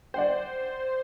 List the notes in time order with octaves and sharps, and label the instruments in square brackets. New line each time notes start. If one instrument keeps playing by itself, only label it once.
[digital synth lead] C5 [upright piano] D5 F#5 G5